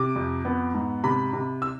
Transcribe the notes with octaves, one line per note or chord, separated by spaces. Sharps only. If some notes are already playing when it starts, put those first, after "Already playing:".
Already playing: C3 D6
F2
B3
G#2
C3 B5
C3
E6